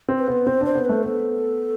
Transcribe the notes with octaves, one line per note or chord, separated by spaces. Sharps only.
C4
B4
B3
C4 C5
D4 C5
B3
A3 B4
B3 A4